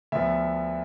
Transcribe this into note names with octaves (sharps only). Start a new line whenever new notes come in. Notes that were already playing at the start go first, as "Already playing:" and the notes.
D2 D3 F3 B3 E5